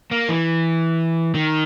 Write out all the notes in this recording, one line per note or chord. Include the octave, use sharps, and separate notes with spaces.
A#3
E3
D#3